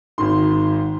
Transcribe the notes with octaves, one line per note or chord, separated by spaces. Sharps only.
G#1 G#2 D#3 C6